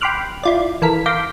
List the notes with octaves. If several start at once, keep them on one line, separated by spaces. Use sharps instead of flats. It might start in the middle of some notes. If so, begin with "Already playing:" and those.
G5 B5 C6 D6 F6 F#6
E4 F4 D5
E3 A4 A#4 B6
F5 C6 D6 G6 A#6 B6